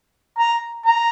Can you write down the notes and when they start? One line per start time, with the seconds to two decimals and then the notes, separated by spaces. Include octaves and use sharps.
0.38 A#5
0.85 A#5